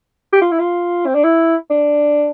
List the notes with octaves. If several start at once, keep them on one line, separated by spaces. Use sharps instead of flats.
G4
F4
E4
F4
C4
D4
E4
D4